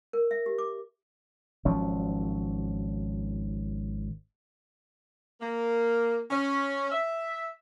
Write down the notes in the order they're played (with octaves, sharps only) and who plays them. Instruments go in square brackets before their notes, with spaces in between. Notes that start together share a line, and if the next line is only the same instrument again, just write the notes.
[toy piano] A#4
E5
G4
D6
[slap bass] G#1 F3 F#3 C#4
[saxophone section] A#3
C#4
E5